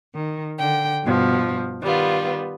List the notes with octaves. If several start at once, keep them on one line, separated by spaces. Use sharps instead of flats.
D#3
D3 G5
G2 B2 F3
D#3 G3 B3 F4